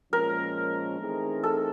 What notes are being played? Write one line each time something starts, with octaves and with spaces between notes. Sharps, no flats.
A#2 F3 G#3 C#4 A#4
E3 A3 C4 D#4 G#4
A4